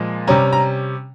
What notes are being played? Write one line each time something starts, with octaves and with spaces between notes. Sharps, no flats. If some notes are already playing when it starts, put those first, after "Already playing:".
Already playing: A#2 F3 G#3
C3 G3 C#4 A#5
A#5